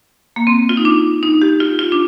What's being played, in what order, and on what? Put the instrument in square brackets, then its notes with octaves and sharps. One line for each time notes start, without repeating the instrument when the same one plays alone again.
[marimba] A#3
C4
F4
D#4
D4
D#4
G4
F4
F4
D4